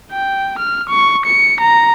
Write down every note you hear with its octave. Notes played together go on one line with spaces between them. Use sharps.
G5
F6
C#6
C#7
A#5